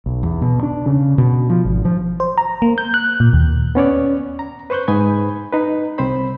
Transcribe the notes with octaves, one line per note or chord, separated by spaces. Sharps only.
B1
E2
B2
D4
C#3
B2
F3
G#1
F3
C5
A#5
A#3
G6
F#6
A#2
D#2
B3 C#4 C#5 D5
A#5
B4 C5 C#6 F#6 G6
G#2 B4 G#5 B5 D#6 G#6
D#4 B4
C2 C4 C5 B5